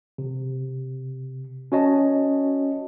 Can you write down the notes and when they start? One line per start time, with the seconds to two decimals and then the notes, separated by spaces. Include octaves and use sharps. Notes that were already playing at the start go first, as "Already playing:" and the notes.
0.18 C3
1.72 C#4 F#4 C#5 D#5 A5